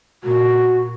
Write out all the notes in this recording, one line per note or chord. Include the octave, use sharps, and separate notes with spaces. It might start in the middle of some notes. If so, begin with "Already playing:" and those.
A#2 F#4